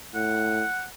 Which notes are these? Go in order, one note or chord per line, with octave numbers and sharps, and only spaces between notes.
A2 F#5